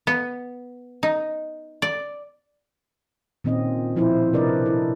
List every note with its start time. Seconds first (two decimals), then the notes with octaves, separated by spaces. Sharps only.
0.07 B3
1.03 D#4
1.82 D5
3.44 A#2 D#3 C4 C#4 D#5
3.96 B2 F3 E4 C5
4.33 C3 D4 A#4 B4 D5 D#5
4.66 E4 A4